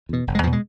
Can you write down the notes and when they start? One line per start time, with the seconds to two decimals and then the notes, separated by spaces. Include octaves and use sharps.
0.09 E2 B2
0.27 F1
0.35 G#3
0.43 E2 F3
0.47 B2
0.53 G#3